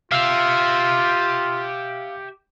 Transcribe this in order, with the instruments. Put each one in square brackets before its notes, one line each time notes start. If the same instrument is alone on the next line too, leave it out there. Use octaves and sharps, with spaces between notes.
[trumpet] F4 [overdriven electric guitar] G4 E5 [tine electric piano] F5 E6 F6